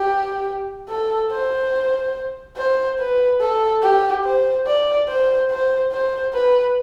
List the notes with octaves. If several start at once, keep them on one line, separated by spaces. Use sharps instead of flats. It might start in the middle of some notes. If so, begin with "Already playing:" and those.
Already playing: G4
A4
C5
C5
B4
A4
G4
C5
D5
C5
C5
C5
B4